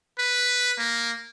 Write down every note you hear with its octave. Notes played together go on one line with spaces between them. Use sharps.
B4
A#3